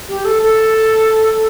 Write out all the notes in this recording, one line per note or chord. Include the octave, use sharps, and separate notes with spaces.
G4
A4
A4